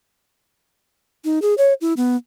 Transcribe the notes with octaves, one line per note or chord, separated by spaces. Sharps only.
D#4
G#4
C#5
E4
B3